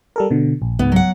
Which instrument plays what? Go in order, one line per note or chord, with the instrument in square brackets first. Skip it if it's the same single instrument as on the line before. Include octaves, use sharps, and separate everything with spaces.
[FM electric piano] G3 A4 A#4
B2 D3
A#1
[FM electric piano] C#2 G#2 [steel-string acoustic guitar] B3
[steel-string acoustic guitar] F#3 F#5